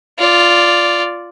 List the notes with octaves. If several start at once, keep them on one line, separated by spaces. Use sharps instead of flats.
F4 D5